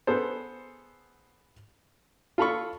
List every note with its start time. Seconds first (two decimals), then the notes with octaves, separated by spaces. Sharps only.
0.07 B3 G#4 A4 C5
2.38 F4 A4 B5 C#6